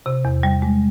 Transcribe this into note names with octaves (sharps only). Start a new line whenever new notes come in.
C3
E2
G3
G#3